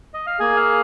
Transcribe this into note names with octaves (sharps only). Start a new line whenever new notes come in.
D#5
F5
A#3 G#4 G#5
F5